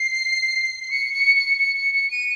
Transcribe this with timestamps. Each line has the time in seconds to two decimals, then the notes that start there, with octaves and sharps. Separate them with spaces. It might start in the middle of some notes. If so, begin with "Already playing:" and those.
Already playing: C7
0.84 C7
0.91 C#7
1.13 C#7
1.37 C#7
1.59 C#7
1.76 C#7
1.94 C#7
2.11 D#7